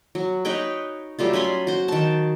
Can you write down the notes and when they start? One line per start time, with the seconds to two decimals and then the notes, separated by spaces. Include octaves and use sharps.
0.15 F#3
0.45 D#4 B4 C#5 G5
1.19 F#3 G3 A3 F4
1.33 C#4 G#5 B5 C6
1.67 F#4 C5
1.88 D#3 A5